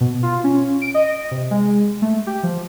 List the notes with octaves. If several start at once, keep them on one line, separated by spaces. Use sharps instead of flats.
B2
F4
C#4
D7
D#5
C3
G#3
A3
G4
F3